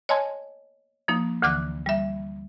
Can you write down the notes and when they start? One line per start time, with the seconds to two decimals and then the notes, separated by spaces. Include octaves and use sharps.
0.09 C#5 D#5 G#5 A5 C6 G#6
1.08 F3 A#3 D#4
1.42 D2 D3 E3 D6 F6 F#6
1.86 G3 E5